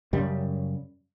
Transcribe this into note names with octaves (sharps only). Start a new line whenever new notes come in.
F#2 C#3 G3